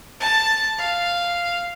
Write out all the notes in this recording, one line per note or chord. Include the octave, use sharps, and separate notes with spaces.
A5
F5